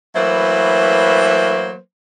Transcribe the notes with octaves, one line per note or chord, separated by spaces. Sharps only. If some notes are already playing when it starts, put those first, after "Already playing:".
E3 F#3 A3 A#3 B4 C5